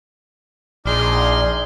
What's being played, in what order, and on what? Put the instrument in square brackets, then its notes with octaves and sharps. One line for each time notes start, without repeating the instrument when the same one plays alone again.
[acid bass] A#1 [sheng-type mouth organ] D#4 D6 F6 [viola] G#4 C6 [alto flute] D5